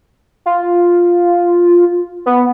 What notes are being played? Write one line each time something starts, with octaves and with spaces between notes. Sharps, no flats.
F4
B3